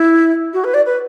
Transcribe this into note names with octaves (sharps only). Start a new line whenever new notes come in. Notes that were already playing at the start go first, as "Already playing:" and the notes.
Already playing: E4
F#4
B4
D5
B4